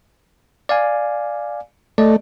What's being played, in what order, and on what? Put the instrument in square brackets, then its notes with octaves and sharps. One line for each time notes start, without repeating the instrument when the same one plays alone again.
[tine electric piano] D5 F5 G#5
[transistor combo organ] A3 [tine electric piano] D5 D#5